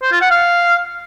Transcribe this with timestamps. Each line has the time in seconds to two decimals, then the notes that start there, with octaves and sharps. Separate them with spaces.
0.02 C5
0.12 F4
0.21 F#5
0.31 F5